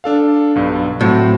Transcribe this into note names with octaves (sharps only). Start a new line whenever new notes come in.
D4 A4 F5
B1 G2
A2 F#3 C4 F#4